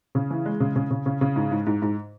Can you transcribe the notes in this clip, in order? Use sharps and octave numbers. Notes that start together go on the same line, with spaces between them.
C#3
E3
G#3
C#3
C#3
C#3
C#3
C#3
G#2
G#2
G#2
G#2